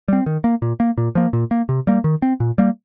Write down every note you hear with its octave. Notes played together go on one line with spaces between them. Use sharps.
G3 C4
D#3
A#3
A#2
A#3
A#2
F3 A#3
A#2
A#3
C3
G3 A#3
D#3
C4
A#2
G3 A#3